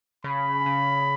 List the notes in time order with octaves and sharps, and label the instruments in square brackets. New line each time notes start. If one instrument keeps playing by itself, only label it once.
[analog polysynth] C#3 [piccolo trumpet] B5
[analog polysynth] C#3